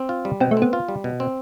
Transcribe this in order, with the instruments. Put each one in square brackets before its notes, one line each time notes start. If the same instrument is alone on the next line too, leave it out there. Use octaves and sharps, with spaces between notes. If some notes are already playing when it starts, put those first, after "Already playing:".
Already playing: [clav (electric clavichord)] C4
F4
G3
[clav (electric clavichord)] B2 [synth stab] C4
[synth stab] A3
[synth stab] B3 [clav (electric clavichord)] C4
[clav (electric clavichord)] F4
G3
B2
C4